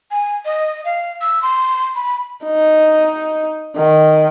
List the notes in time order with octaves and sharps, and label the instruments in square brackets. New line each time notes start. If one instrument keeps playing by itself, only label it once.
[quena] G#5
D#5
F5
E6
C6
B5
[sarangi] D#4
D#3